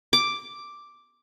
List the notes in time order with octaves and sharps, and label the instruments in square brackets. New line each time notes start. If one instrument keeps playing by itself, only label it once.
[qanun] D6